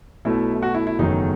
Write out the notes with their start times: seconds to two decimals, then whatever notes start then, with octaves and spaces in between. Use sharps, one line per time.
0.25 B1 B2 A3 E4
0.63 F#4
0.74 E4
0.87 E4
0.99 F#1 E2 D#3 F#3 A3 D#4